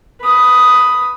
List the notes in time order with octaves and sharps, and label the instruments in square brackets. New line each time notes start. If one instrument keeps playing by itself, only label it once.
[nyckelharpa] B4 D#6